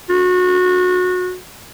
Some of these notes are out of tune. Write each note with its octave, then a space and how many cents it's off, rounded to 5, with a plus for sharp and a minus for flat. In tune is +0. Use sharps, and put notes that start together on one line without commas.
F#4 -25